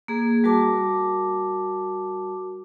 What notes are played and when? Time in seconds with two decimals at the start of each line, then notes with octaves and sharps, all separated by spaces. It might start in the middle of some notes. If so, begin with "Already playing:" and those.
0.08 A#3 G#4
0.44 G3 F#4 A#4 A5 D6